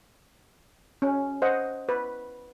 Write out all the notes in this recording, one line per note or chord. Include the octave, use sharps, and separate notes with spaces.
C#4
C5 D#5 F#5
B4